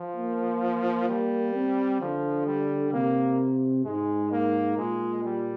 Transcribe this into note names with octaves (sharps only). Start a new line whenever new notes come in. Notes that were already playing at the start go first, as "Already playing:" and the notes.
Already playing: F3
A#3
G3
C4
D3 F3
G3
C3 A#3
G#2 G#3
A#3
A#2 G#3
G3